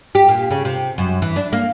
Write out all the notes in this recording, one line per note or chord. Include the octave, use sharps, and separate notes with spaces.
G4
A#2
C#3
C3
F#2
E3
D4
A#3